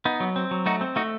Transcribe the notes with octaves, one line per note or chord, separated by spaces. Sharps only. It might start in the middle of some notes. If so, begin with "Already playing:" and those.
B3 D#4
F#3
C4
F#3
A3 D#4 F#4
C4
A3 D#4 F#4